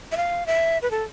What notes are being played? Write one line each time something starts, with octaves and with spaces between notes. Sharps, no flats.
E5
F5
E5
B4
A4